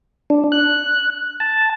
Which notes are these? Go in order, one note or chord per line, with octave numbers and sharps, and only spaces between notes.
D4
F#6
A5